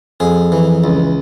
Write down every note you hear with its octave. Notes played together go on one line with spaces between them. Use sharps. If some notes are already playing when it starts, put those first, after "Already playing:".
F2 G#4
E3
C#2